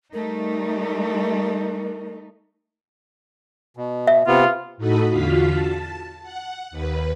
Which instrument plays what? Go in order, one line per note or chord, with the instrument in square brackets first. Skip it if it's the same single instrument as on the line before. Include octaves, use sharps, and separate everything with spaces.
[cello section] G3 A3 D#4 [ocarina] A#4
[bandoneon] B2
[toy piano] E5
[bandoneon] C3 B3 [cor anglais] F4
[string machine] A2 D#4 F#4 A4 B5 D#6
E2 D3 F4 F#4 F5 B6
A5
F#5
D#2 B4